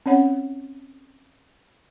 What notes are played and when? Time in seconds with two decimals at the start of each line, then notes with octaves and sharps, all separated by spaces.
0.06 C4 C#4 C#5 F#5